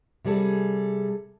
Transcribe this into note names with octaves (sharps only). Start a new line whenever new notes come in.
C3 G3 G#4 A4